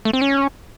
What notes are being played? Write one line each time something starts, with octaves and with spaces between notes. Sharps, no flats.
A3
C4
C#4